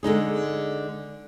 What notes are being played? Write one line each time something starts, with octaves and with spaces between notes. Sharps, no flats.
D3 G#3 D#4 G#4